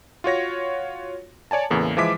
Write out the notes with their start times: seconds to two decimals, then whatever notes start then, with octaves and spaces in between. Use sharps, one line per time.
0.24 F4 F#4 C#5 A#6
1.51 C#5 D5 G#5 A5
1.70 E2 A2 C#3 E3 A#3
1.97 E3 F3 G#3 E5 D6 B6